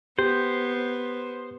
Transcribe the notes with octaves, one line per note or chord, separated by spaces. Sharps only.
B3 G4 C5